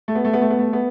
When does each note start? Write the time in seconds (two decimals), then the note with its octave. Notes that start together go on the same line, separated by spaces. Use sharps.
0.08 A3
0.15 B3
0.25 A3
0.33 B3
0.41 A3
0.50 B3
0.59 A3
0.73 B3